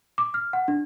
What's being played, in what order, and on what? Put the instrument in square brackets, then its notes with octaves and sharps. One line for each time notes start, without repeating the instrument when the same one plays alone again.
[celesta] D6
F6
F#5
D4